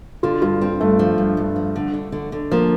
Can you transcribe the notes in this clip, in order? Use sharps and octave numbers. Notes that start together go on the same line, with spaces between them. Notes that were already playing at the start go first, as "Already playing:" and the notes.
D3 F4
G2 F4
C4
G2 A3
F3
G2
G2
F3
D3
D3
D3
D3
F3 A#3